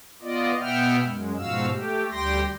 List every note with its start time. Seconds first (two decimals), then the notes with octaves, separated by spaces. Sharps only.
0.22 B3 F4 D5 D#5
0.61 B2 B3 E5 F#5 G5 F6
1.03 F#2 G#3
1.38 G#2 B2 F3 F#4 F5 E6
1.70 A3 G4
2.11 D2 G3 G4 G5 C6 A#6